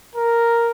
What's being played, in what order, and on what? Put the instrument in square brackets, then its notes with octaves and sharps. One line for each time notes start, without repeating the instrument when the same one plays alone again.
[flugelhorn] A#4